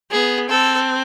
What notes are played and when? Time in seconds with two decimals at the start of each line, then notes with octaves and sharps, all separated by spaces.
0.10 B3 G#4
0.49 C4 A4